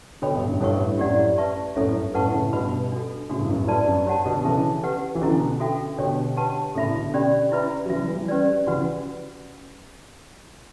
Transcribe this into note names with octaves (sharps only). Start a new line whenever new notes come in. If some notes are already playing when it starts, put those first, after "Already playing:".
B2 D3 A4 C#5 G5 B5
G2 B2
F#2 A2
G2 A4 C#5 F#5 C#6
A2
G2
F#2 A2 G4 D5 F#5
B4 E5 A5 C#6
F#2 A2 A4 C#5 E5
G2
F#2 A2 B4 F#5 A5 C#6
A2 C#3
G2 B2 B4 F#5 B5
D4 F#4 A4
A2 C#3 D4 F#4 A4
G2
F#2 A2
A2
G2 F#4 B4 D5 A5
F#2
G4 C#5 F#5 A5
B2 D3
C#3 E3 A4 E5 A5
G4 B4 F#5
E3
B2 D3 C#4 E4 A4
F#4 A4 E5 G5
B2 D3 D4 G4 C#5 G5 C#6
G4 B4 F#5 A5 C#6
A2 C#3 A4 E5 B5
B2 D3
C#4 G4 D5 G5 B5
E4 B4 E5 B5
F#3
C#3 E3 F#4 B4 E5
E3 G3
C#4 G4 B4 D5
C#3 E3 F#4 B4 F#5 B5